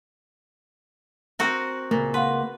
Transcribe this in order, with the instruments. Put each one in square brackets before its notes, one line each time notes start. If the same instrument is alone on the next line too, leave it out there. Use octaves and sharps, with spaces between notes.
[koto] C4 F#4 A#4
[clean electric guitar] C#2 A#3 [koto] A#2
[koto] B4 [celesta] F5 F#5 C6